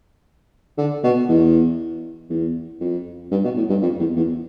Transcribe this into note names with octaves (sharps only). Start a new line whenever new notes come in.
D3
B2
E2
E2
F2
G2
B2
A2
G2
F2
E2
E2